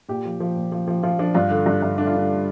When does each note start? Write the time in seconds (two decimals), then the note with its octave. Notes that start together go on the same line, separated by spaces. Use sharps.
0.09 A#2 G4
0.25 F3
0.40 F3
0.56 A#2
0.72 F3
0.88 F3
1.03 F3 F4
1.19 F3 D4
1.34 G2 F4
1.50 D3
1.66 G2
1.82 G2
1.98 D3 D4
2.07 F4
2.14 D3 D4